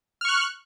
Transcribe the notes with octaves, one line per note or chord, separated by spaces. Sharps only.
C#6 F6 F#6